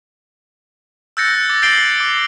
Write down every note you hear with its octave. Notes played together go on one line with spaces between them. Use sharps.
E6 F#6 G6 A6 A#6 C#7
D6 A6
G6 A6 C7 D7 F#7 G7
D6